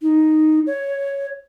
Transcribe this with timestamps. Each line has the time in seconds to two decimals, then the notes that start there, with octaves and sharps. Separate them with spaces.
0.02 D#4
0.66 C#5